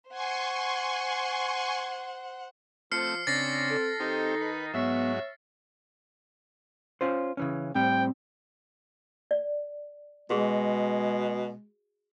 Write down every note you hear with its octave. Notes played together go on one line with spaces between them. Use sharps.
C5 F#5 G#5 C6 C#6
F3 A3 C4 F6 C7 C#7
C#3 C4 D4 A6 A#6 C7
A4
D#3 C4 D#4 G4
B4
G#2 F#3 B3 C#5 E5
C#4 F4 C5
C#3 E3 C#4
A2 G3 C4 G5
D5
B2 G#3 F#4 G#4